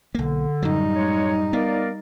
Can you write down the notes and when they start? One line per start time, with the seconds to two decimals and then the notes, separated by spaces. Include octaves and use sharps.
0.15 B1 D3 A#3
0.62 F#2 A2 F#3 G3 D#4
0.95 G#3 C#5
1.53 B3 A#4 D5 F5